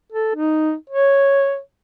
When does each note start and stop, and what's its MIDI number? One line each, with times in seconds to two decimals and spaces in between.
0.12 0.31 69
0.36 0.74 63
0.90 1.59 73